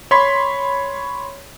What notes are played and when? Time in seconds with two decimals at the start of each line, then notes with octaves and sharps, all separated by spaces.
0.11 C#5 B5 C6 B6